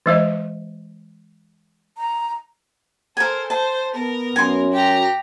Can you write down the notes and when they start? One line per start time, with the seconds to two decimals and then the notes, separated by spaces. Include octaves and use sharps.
0.06 E3 G#3 C5 D#5
1.98 A#5
3.17 A4 A#4 C5 G#5
3.50 C5 A5
3.95 B3 A#4
4.36 F#2 G#5 C6
4.72 F#4 G4 A#5